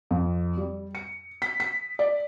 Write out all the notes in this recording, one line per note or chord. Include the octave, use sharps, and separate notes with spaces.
F2
G3
C#7
B6
B6
D5